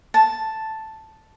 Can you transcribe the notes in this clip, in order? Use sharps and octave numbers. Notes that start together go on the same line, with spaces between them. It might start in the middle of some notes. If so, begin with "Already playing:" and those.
A5